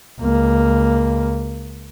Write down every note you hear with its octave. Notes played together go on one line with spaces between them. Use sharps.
C#2 A#3